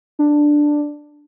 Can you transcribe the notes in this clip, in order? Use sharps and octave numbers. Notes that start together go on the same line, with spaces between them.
D4